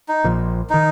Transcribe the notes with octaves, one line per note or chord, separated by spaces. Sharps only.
D#4
A#1 A#2 F3
D#3 D#4